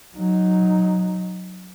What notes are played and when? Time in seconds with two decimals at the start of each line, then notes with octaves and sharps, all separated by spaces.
0.15 F#3 D#4